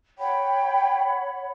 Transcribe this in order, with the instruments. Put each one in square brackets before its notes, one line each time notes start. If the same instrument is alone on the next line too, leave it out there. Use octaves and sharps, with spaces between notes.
[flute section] C#5 F#5 B5 [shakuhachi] G5